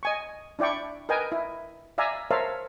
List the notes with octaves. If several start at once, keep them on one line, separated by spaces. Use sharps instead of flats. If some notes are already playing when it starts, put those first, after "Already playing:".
D#5 G#5 C#6
D4 E4 D5 G5 C#6
A#4 B4 D#5 G5 G#5 A#5
E4
D5 E5 F5 G#5 A#5
A#4 C5 C#5 E5 F5 A5